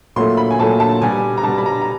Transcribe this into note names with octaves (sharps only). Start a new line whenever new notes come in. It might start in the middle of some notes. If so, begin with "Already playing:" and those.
A#2 F#3 A3 C6
B5
G#5
A#2 F#3 A3 A5
A5
B2 G3 G#5
A#5
B2 G3 A5
B5
A#5
A#5